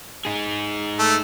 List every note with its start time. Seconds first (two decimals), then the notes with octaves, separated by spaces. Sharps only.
0.25 D#4 G#4
0.99 A3